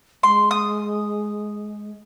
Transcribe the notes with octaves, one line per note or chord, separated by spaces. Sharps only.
G#3 C6
D#6